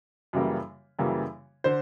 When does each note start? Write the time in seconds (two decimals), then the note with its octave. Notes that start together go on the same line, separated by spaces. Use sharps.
0.33 F#2 C#3 E3 G3 A#3
0.99 F#2 C#3 E3 G3 A#3
1.64 D3 C5